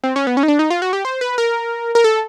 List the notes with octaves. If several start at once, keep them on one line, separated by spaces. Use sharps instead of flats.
C4
C#4
B3
C#4
D#4
D4
D#4
F4
F#4
G4
C5
B4
A#4
A#4
A4